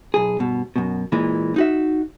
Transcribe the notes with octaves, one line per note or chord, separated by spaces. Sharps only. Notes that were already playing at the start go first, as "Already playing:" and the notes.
B1 G#4
G2 B2
F#2 B2
A#2 E3 G#3
D#4 F#4 E5